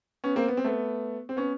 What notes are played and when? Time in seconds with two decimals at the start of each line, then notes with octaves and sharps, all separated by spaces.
0.24 B3 C#4
0.36 A#3 C4
0.48 B3
0.57 C4
0.64 A3 B3
1.29 C4
1.37 B3 C#4